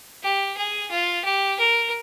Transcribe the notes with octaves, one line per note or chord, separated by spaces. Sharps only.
G4
G#4
F4
G4
A#4